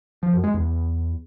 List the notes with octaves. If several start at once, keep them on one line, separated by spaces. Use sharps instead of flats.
F3
F#2
G#3
E2